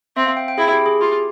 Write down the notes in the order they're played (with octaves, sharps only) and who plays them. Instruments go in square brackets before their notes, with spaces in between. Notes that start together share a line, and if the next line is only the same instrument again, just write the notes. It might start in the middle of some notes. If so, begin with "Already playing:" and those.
[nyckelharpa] C4 [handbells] E5
[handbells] F5
G5
G5
[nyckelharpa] E4 [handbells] G#4
[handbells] G4
G#4
[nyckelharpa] F4 [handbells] G4